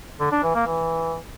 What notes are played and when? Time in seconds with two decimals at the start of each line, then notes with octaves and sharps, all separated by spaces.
0.20 D3
0.32 D4
0.43 E3
0.55 A#3
0.67 E3